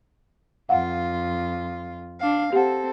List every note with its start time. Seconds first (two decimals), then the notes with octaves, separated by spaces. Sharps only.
0.69 F2 F4 F5 F#5
2.19 D4 F5
2.53 C4 G4 A4 F#5